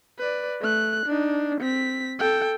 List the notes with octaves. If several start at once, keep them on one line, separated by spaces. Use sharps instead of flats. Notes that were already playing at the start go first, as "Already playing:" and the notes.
B4 D5
A3 F#6
D4 D#4
C4 B6
A4 G5